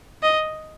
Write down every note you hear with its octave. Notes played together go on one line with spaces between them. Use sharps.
D#5